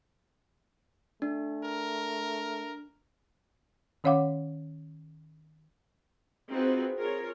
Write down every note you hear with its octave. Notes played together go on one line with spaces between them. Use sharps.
A3 D4
A#4
D#3 C#4 C#5 F5 F#5 D6
C4 D#4 F4 F#4 G#4 B4
F4 G#4 A#4 C#5